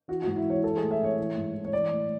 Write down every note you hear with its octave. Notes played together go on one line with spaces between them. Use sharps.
E3 F#4
G#2 F#4
E4
E3
C#5
E3 A4
A2 G#4
E5
E3 C#5
E3
G#2
E3
C#5
E3 D5
A2